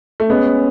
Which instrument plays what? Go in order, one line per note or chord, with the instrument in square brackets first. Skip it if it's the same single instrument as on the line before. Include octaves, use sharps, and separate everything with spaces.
[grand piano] A3
[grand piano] G#3 B3 [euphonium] C#4